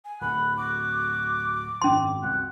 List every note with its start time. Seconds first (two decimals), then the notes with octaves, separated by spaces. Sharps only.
0.05 G#5
0.21 D1 F#5 B5
0.57 F#4 D6
1.82 G#1 F#2 C#4 C6
2.23 C2 F#2 F#5